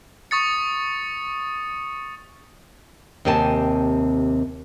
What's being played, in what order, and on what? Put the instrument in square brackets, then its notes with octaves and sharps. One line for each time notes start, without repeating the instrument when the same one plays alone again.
[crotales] C#6 D#6 A6 C#7
[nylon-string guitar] D#2 C3 C4 G#5 A5